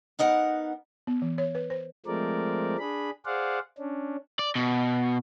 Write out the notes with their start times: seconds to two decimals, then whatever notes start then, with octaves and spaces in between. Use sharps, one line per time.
0.19 B3 D#4 A#4 F#5
1.07 B3
1.22 E3
1.38 C#5
1.55 B4
1.70 C5
2.06 F3 G#3 A3 C4 A#4 D5
2.79 D4 G#4 B5
3.25 G#4 C5 D5 F5 F#5
3.78 C#4 D4
4.39 D5
4.55 B2